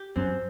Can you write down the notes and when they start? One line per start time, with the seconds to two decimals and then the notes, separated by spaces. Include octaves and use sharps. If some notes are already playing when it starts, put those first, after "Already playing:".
Already playing: G4
0.16 F#2 C4